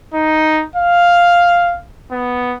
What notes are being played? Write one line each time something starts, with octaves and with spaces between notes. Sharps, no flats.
D#4
F5
B3